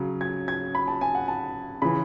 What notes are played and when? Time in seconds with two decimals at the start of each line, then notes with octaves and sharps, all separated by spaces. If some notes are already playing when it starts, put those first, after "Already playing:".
Already playing: C#3 F#3
0.21 G#6
0.48 G#6
0.75 B5
0.88 A5
1.01 G#5
1.15 F#5
1.28 A5
1.82 C#3 E3 B5